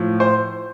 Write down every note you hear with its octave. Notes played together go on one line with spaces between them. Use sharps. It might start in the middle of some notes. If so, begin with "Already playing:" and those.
Already playing: A2 F3
C5